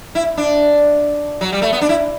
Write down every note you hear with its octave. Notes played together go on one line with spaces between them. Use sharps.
E4
D4
F#3
G3
A3
B3
D4
E4